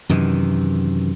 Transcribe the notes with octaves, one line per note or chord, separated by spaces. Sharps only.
F#2 C3 D#3 E3